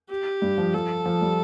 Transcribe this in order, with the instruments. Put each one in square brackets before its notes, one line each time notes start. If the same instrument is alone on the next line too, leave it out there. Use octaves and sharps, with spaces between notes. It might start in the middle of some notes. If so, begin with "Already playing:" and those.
[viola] G4
[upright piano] G2
F3
[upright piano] F3 [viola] A4
[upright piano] F3
G3